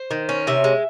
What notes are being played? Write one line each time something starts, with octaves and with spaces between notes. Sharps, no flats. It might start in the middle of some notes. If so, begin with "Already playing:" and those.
Already playing: C5
D#3
C#4
C3 E5
G#3